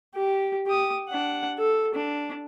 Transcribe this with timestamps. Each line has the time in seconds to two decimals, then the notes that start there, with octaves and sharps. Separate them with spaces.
0.15 G4
0.67 G4 D#6
1.09 D4 F#5
1.58 A4
1.95 D4